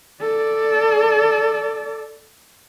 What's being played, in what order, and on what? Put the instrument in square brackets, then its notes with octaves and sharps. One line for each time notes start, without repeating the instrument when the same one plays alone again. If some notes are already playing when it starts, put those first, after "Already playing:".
[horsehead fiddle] A4 D5